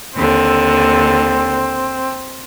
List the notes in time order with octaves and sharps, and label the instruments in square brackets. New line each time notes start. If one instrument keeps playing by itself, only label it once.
[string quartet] D#2 D3 [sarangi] C4